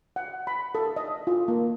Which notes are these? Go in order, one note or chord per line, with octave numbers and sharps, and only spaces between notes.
F#5
B5
A4
D#5
F4
A#3